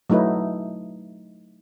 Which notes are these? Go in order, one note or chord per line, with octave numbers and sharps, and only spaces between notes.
F#3 A3 D#4 E4 B4